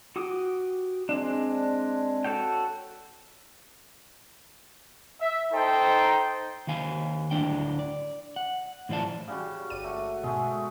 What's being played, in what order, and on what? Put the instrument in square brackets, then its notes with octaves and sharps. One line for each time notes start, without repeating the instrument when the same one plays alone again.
[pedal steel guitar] F#4 G4 D6 D#6
G#3 C4 D4
F#4 A4 C#5 G5
[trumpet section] E5
D#4 A4 C5 G5
[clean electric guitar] D#2 D#3 F5 G#5
D2 A2 D4 G5
D5
F#5
A2 E3 F3 F4 D5 A5
[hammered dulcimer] C#3 G3 F#4
[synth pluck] G1 D#7 [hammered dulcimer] D5
[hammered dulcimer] A3 F#5
[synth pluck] G#2 B2 [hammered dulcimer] G#3 A3